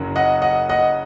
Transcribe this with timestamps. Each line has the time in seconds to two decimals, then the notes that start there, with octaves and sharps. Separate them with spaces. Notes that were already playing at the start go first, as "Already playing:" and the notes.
Already playing: F#1 F#2 C#3 F#3
0.16 D#5 F#5
0.42 D#5 F#5
0.69 D#5 F#5